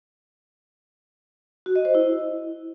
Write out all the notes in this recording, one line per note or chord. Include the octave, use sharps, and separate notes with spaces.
F#4
D#5
C5
E4